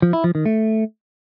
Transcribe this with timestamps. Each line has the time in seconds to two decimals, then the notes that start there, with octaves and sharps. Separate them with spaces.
0.02 F3
0.13 E4
0.24 F3
0.35 D#3
0.46 A3